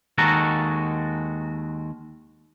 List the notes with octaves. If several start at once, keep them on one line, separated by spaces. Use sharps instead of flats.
D#2 D#3 G#3 F#4 A4 A#5